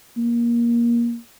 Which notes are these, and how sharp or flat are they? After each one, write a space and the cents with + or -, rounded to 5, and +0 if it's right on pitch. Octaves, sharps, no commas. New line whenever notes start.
A#3 +20